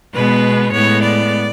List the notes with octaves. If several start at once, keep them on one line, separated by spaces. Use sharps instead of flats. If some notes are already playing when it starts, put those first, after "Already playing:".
B2 G#3 B3 B4
A2 G#3 B3 C#5
D5